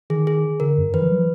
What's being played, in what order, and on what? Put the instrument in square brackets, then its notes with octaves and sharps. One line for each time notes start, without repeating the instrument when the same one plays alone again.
[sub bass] D#3 [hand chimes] G#4
[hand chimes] G#4
[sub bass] D3 [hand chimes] A#4
[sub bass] F#2
[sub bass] D#3 [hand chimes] B4
[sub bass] F3
F#3
F3